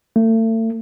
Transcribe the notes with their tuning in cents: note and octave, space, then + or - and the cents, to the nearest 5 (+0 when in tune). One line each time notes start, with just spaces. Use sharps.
A3 +35